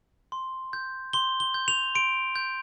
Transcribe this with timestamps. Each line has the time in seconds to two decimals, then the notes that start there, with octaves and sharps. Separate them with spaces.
0.32 C6
0.73 G6
1.13 C6 G7
1.40 G7
1.54 G6
1.68 F7
1.95 C6 D7
2.36 G6